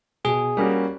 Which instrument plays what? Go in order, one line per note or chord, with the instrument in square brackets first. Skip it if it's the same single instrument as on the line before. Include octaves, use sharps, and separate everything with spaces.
[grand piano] B2 [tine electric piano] G#4
[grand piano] G3 A#3 C#4 F#4